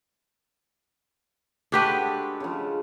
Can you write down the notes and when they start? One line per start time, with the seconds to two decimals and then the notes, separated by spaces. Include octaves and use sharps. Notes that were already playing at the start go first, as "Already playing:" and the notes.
1.72 G#3 D4 F#4 G4 A4 B4
2.40 C#3 F3